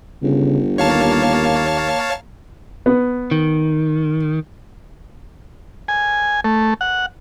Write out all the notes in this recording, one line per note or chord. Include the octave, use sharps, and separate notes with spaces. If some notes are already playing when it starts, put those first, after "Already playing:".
G1 C#3
D#2 A#3 C#5 F5 A5
B3
D#3
G#5
A3
F#5